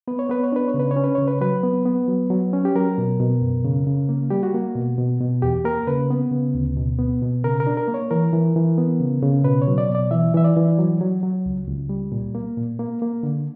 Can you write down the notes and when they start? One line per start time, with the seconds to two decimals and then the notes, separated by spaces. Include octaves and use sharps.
0.08 B3 B4
0.19 C#5
0.30 B3 B4
0.44 C#5
0.52 D4 B4
0.68 C#5
0.74 C#3
0.79 B4
0.91 C#5
0.96 C#4
1.04 B4
1.15 C#3 C#5
1.28 B4
1.41 F#3 B4
1.63 B3
1.86 B3
2.08 F#3
2.30 F#3
2.53 C#4
2.65 G4
2.76 F#3 A#4
2.98 B2
3.20 B2
3.42 F#2
3.65 C#3
3.87 C#3
4.09 A#3
4.31 G3 G4
4.43 F#4
4.54 A#3
4.76 B2
4.98 B2
5.21 B2
5.42 E2 G4
5.65 A#3 A#4
5.87 C#3 B4
6.10 B3
6.32 C#3
6.55 D2
6.77 B2
6.99 B3
7.22 B2
7.44 C#3 A#4
7.60 A#4
7.67 D4
7.77 A#4
7.88 A#3
7.94 C#5
8.11 E3 A#4
8.33 E3
8.56 E3
8.78 B3
9.00 C#3
9.22 C#3
9.44 B2 B4
9.62 C#5
9.67 F#3
9.78 D5
9.90 B2 D5
10.11 E3 E5
10.34 E3 E5
10.44 D5
10.57 E3
10.79 F#3
11.01 F#3
11.23 F#3
11.46 C#2
11.68 C#2
11.89 G3
12.12 A#2
12.35 A#3
12.58 A#2
12.79 A#3
13.02 A#3
13.23 D3